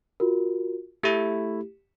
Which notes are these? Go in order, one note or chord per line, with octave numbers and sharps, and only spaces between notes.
F4 F#4 A#4
A3 E4 G4